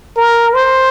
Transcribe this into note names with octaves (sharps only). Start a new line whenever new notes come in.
A#4
C5